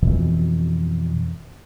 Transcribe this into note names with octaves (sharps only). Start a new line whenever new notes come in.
F2 B2 E3